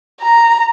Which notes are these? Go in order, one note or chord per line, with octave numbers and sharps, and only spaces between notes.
A#5